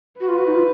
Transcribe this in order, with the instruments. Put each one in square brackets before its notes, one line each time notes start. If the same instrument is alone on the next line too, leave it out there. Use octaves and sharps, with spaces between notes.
[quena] F#4 [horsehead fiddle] B4
[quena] F4
F#4
D#4
F4